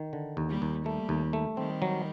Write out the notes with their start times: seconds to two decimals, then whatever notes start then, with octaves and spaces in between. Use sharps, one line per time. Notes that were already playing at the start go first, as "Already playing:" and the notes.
Already playing: D#3
0.13 D3
0.37 D#2
0.49 G3 A#3
0.62 D#2
0.85 G3 A3 A#3
1.09 D#2
1.33 A3
1.57 D#3 G3 C4
1.82 F#3